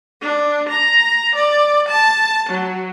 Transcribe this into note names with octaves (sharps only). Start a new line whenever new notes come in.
D4
A#5
D5
A5
F#3